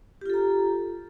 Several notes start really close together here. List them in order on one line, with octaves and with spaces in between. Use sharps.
G4 F4 A4 A#5